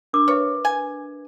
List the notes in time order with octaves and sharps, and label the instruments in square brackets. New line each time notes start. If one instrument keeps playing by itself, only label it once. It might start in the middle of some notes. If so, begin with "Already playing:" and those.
[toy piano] D4 A#4 D6
[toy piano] B4 E5 [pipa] C#5
[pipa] G#5